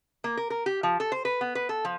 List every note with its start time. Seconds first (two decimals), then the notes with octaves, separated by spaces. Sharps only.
0.24 A#3
0.37 A#4
0.50 A#4
0.66 G4
0.83 F3
1.00 A4
1.12 C5
1.25 B4
1.41 B3
1.55 B4
1.69 A4
1.85 F3